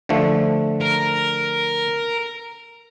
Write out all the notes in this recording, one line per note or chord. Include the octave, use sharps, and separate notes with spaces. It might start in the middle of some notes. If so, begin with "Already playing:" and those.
D3 F3 A3
A#4